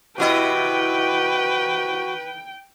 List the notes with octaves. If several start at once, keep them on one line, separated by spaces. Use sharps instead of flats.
C3 E4 F#4 B4 D#5 G5